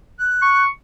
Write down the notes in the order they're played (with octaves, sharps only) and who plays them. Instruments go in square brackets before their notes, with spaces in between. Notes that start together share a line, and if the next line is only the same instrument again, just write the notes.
[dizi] F#6
[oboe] C#6